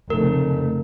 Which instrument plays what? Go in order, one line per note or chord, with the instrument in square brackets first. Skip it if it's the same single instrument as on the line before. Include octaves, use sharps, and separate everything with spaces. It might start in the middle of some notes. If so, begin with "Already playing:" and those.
[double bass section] F1 C#3 A3 [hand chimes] A#4